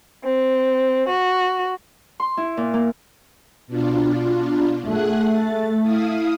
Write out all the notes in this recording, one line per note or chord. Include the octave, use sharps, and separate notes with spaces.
C4
F#4
C6
E4
A#2
A#3
B2 D4 F4
A3 G#4 F#5 F#6
A6
E4 F5 D#6